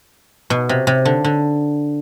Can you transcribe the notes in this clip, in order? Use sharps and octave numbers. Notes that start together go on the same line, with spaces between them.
B2
C3
C3
D3
D3